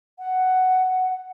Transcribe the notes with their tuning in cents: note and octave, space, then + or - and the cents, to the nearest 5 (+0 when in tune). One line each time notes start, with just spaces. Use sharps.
F#5 +5